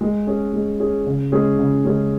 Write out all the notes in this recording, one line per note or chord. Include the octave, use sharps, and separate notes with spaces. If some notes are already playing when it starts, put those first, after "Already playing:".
G#3
C#4 G#4
G#3
C#4 G#4
C#3
G#3 C#4 G#4
C#3
G#3 C#4 G#4